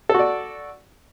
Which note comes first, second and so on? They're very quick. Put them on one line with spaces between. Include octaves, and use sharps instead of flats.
A4 F#4 D5